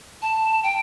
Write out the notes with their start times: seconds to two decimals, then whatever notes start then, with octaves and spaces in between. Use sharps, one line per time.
0.22 A5
0.63 G5